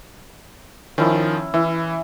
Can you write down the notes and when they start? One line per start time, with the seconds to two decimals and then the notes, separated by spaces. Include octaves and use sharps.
0.98 D#3 F3 C#4 E4
1.54 E3 E4 E5